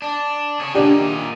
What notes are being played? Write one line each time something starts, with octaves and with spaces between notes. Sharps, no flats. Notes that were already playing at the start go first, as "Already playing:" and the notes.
D4
C#4 G#4
A#2 D4 D#4 G4